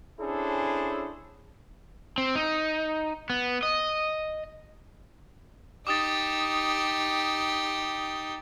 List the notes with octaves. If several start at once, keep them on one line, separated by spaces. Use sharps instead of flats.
C#4 D4 E4 G#4 A4 C5
C4
D#4
B3
D#5
D#4 G4 D6 D#6 A6